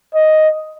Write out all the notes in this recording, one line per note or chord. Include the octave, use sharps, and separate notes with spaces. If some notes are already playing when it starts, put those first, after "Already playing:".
D#5